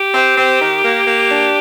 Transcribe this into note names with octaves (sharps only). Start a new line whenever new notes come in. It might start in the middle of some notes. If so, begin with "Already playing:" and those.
Already playing: G4
C4
C4
D#3
A#3
A#3
D4